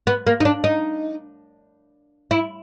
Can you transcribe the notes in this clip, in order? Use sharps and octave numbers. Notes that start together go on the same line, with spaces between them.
B3
A#3
D#4
D4
D#4
E4